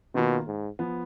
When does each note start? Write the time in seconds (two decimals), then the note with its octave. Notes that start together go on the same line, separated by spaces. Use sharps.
0.15 B2 D#3 A#3 F4
0.47 G#2
0.79 F3 B3